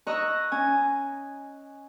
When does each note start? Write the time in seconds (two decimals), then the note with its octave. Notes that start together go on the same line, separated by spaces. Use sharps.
0.07 D#5 A#5 C#6 D#6 E6 F#6
0.52 C#4 G#5